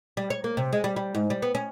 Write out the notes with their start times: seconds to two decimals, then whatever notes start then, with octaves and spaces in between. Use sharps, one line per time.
0.17 G3
0.30 C#5
0.44 A#3
0.57 C3
0.73 G#3
0.84 G3
0.96 G3
1.15 G#2
1.30 G3
1.42 B3
1.55 C#4